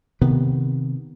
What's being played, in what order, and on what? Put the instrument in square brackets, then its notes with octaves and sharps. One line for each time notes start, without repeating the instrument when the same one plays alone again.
[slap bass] C3 D#3 B3